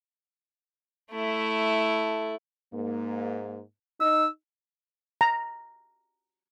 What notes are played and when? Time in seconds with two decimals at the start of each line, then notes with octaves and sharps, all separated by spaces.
1.11 A3 E4
2.74 G#2 A#3
4.01 D#4 E6
5.21 A#5